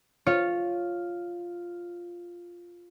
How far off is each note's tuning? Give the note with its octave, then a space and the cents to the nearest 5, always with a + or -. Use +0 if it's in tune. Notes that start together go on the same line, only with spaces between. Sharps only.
F4 +0 C#5 -10